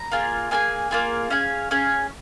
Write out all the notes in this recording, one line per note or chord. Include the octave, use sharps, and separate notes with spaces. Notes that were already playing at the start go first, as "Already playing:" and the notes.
Already playing: A#5
A#3 F4 G#4
A#3 F4 G#4 G#5
A#3 F4 G#4
C#4 G#4 F5
C#4 G#4